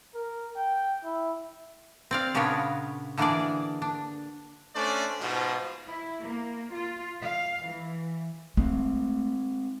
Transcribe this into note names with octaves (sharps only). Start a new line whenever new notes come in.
A#4
G5
E4
C4 D5 F5
A#2 C#3 B3 D4 A#4 C#5
D3 E3 A#3 D4 G#4 D5
D4
A3 C#4 D4 C5 D5
G#2 B2 F3
E4
A#3
F4
F5
E3
G#3 A3 C4